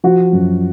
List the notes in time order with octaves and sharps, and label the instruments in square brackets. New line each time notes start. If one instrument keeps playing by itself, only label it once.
[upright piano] F3 F#4
F#2